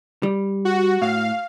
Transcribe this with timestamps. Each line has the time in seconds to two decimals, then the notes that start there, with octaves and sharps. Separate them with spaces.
0.23 G3
0.65 F#4
1.02 A2 F5